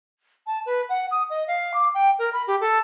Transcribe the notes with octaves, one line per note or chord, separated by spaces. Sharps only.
A5
B4
F#5
D#6
D#5
F5
D6
G5
A#4
B5
G4
A4